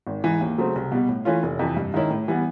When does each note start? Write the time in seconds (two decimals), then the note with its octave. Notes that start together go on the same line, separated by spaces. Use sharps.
0.07 G#1
0.24 G#2 E3
0.41 D#2
0.58 C#3 F#3 A3 C4
0.76 C2
0.92 B2 G3
1.09 A2
1.25 E3 A3 C#4 F4
1.43 F1
1.59 F2 C3 E3
1.76 G2
1.94 D#3 G#3 C#4 E4
2.10 A2
2.28 E3 G3 B3